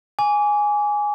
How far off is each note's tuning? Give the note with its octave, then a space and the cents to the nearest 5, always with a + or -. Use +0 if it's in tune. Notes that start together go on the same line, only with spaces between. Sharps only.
G#5 +0 D6 -30